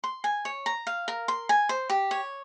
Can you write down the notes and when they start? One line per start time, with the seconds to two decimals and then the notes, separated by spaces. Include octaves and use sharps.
0.04 C6
0.24 G#5
0.45 C#5
0.66 A#5
0.87 F5
1.08 A#4
1.28 C6
1.49 G#5
1.69 C5
1.90 G4
2.11 C#5